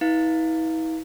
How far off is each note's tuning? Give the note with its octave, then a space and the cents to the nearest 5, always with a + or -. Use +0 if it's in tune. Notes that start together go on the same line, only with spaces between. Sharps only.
E4 -45 B4 -20 F5 +0